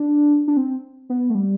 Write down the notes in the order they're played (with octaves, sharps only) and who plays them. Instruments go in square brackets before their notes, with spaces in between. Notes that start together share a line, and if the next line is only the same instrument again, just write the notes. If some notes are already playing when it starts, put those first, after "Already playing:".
Already playing: [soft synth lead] D4
D4
C4
B3
A3
G3